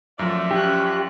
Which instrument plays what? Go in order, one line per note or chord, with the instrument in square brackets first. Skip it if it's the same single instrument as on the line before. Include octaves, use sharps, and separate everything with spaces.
[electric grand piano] F#2 F3 [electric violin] A3 [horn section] C#5 D5 E5
[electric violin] C#4 F#6 [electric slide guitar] G4